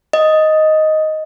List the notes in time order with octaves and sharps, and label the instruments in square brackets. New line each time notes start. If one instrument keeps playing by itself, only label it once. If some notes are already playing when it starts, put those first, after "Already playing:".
[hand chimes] D#5